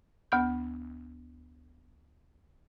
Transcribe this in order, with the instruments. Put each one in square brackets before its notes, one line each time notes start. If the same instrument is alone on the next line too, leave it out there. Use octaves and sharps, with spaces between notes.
[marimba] D2 B3 G6